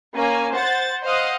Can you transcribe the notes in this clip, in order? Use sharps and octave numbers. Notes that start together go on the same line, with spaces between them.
A#3 C#4 G#5
C5 F#5 A6
C5 D#5 F5 F#5 D#6